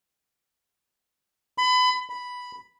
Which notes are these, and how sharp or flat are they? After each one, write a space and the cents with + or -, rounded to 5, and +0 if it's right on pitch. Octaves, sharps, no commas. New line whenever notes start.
B5 +30
B5 +0